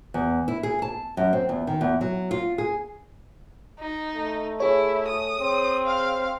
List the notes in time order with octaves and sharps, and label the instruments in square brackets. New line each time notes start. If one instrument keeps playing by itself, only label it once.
[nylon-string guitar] E2
E4
G#4
A5
F#2
C4
E2
D#3
E2
F#3
F4
G#4
[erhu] D#4
[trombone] A3
[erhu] E4 [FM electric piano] G#4 C#5
[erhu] D#6
[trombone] C4
[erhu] F5